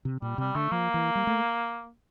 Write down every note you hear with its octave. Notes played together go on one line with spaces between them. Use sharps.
C3
A#2 G3
C3 G3
D3 A3
F3 A#3
E3
G3
A3